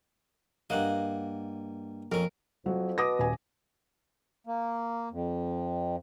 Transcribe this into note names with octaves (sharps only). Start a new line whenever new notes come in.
G2 A#3 D#5 F#5
F2 C#4 A#4
F2 F#3
B2 D6 D#6 A#6
D#1 G#5
A#3
F2